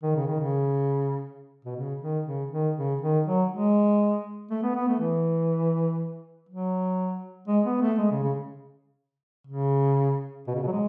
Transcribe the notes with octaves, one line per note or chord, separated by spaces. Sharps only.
D#3
C#3
D#3
C#3
B2
C#3
D#3
C#3
D#3
C#3
D#3
F#3
G#3
A3
B3
B3
A3
E3
F#3
G#3
B3
A3
G#3
C#3
C#3
C#3
B2
C#3
B2
F#3
G#3